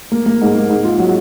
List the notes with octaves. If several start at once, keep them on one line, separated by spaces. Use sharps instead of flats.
A#3
A#3
G#2
A#3
G#2
F4
F#3